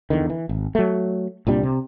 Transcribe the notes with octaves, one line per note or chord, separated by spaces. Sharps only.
E2 D3 D#3
E3
G#1
F#3 A3
C2 A#2 G3 D4
C3